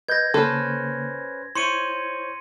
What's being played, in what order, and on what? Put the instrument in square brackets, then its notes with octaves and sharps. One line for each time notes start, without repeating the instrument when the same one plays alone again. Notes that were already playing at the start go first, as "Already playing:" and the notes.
[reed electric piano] B4 D#5 G6 [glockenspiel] G#6 A#6
[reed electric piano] C#3 A#3 [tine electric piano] C#4 B4 C5 [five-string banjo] A4
[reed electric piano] E4 [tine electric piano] C5 C#5 C#6 [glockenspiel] C6 C#7 D#7